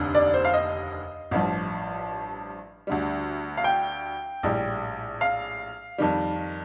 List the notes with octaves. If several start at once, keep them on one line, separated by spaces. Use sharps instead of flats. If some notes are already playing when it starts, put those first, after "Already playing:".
Already playing: F1 D#2 D3
D5
C5
F5
D#5
A1 G2 F3
D2 D3 G3
F5
G5
A#1 A2 G3
F5
F2 D#3 G3